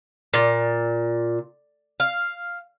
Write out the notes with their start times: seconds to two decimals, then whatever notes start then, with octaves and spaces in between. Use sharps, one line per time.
0.34 A#2
2.00 F5